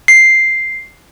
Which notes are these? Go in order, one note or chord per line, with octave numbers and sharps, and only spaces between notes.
C7